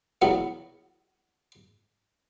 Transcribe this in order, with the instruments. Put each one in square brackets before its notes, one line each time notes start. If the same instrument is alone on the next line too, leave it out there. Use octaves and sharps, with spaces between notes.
[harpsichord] B1 E2 B2 E3 F#3 B3